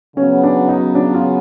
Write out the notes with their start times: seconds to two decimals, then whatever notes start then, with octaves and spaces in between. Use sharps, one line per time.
0.17 C#3 F#3 B3 C#4
0.44 D4
0.68 D#4
0.95 D4
1.14 F4